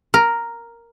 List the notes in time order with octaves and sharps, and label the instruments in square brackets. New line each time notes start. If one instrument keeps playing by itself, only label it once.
[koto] A#4